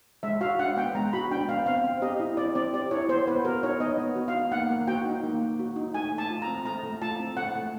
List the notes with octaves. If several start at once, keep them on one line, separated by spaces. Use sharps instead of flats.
G#3 E5
F#4 F5
D4 F#5
B3 G5
G#3 A#5
F#4 B5
D4 G5
B3 F5
C4 F5
C4
G4 D#5
E4
C4 D5
C4 D5
G4 D5
E4 C#5
B3 C5
B3 B4
F#4 A#4
D#4 C#5
B3 D#5
B3
F#4
F5
D#4
A#3 F#5
A#3
F#4 G5
D#4
A#3
A#3
F#4
D#4
A3 G#5
A3
A5
F4
A#5
C4
A3 A#5
A3
F4 A5
C4
A3 F#5
A3